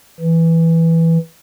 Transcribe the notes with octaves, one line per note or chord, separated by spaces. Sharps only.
E3